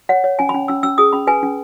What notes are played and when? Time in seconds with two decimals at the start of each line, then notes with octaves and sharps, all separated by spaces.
0.09 C#5 F#5
0.24 C#5
0.39 C#4 G#5
0.49 B5
0.54 C#4
0.68 C#4 E6
0.83 C#4 E6
0.98 G#4 D#6
1.13 C#4 B5
1.27 B4 G#5
1.43 C#4